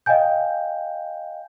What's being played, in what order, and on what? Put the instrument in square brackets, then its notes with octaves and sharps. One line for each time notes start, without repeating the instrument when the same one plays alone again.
[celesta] D#5 F5 G5 G#5 G6